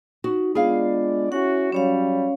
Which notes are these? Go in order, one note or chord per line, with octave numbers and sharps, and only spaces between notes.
D#4 F#4
G#3 B3 D4 F4 G#4 D5 F5
C#4 E4 F#4 F#5
F#3 G3 C#4 C#5 F5